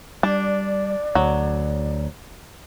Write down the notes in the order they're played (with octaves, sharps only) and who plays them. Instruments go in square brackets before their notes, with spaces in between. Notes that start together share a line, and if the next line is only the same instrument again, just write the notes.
[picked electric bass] G3 [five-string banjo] D4 [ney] D5
[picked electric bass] D2 [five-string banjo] F#3